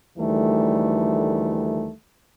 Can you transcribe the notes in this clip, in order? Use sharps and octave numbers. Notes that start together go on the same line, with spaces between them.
D2 D#3 E3 G3 A3